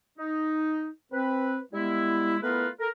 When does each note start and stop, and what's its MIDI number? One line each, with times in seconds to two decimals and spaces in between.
0.18 0.90 63
1.12 1.60 60
1.12 1.60 71
1.73 2.37 55
1.73 2.37 56
1.73 2.37 59
1.73 2.37 64
2.43 2.68 57
2.43 2.68 59
2.43 2.68 64
2.43 2.68 65
2.43 2.68 70
2.43 2.68 71
2.80 2.89 69
2.80 2.89 70